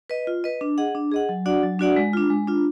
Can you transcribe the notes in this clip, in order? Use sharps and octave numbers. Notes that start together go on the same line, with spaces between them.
B4 D#5
F4
B4 D#5
D4
G#4 D#5 F#5
D4
G#4 D#5 F#5
F#3
D4 F#4 D5 F#5
F#3
D4 F#4 D5 F#5
G#3
D4 F4
G#3
D4 F4